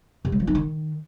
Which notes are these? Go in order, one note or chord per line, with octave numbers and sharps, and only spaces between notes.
C3
G#3
F3
D#4
D#3